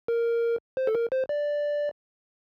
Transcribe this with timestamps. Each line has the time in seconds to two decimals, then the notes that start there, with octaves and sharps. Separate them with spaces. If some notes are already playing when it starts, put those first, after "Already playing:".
0.08 A#4
0.77 C5
0.87 A4
0.95 A#4
1.12 C5
1.29 D5